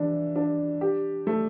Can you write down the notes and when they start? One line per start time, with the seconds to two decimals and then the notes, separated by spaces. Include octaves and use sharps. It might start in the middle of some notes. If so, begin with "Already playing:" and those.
Already playing: E3 D4
0.36 D4
0.81 G4
1.27 A3